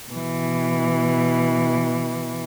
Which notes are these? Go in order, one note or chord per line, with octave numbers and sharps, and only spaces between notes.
B2 E3